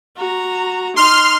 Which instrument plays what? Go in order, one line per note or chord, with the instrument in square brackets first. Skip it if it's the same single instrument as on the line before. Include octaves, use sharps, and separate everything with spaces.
[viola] F#4 A#5
[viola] D#4 [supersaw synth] C6 F6